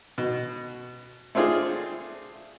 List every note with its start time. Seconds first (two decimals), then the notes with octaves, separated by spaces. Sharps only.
0.18 B2
1.35 A3 C4 D4 F4 G#4